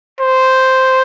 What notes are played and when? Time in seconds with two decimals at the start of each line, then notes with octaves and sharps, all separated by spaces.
0.20 C5